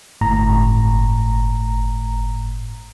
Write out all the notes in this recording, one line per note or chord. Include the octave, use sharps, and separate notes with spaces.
G1 A2 A#5